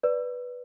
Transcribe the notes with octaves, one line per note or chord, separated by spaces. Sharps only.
B4 D5